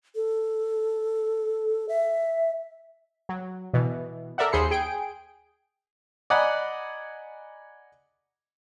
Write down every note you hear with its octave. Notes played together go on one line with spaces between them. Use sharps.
A4
E5
F#3
B2 E3
A4 A#4 D5 E5 F#5
D#2 G#4 C5 B5 C7 C#7
G#4 G5 D7
D5 D#5 F#5 G#5 A#5 B5